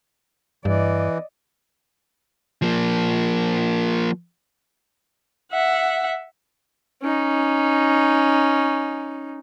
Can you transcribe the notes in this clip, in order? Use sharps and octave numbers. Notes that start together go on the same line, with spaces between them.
G2 E3 D5 D#5
F3 A#3
E5 F#5
C#4 D#4